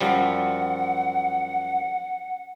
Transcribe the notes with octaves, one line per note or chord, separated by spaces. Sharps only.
F#2 F3 G3 F#5